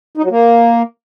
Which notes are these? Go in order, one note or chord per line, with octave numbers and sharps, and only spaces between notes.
D#4
F#3
A#3